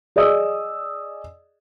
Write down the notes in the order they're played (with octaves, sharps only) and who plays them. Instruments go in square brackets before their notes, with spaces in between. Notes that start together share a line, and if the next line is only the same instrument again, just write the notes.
[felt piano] G#4 D5 D#5 D#6 E6